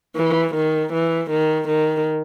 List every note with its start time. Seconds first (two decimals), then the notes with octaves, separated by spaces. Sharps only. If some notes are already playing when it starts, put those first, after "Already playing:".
0.16 E3
0.55 D#3
0.93 E3
1.31 D#3
1.69 D#3